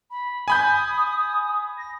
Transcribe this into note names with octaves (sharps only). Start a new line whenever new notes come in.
B5
G#5 B5 D#6 G6
A#6